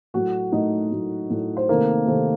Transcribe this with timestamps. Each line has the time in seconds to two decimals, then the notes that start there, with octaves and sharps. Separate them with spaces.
0.14 A2 F#3 A3 F#4 F#5
0.52 A2 F#3 A3 D#4 D#5
0.92 A2 F#3 A3
1.30 A2 F#3 A3
1.57 C5
1.68 C3 D#3 A3 A#3 C4 A#4
2.07 C3 D#3 A3 C4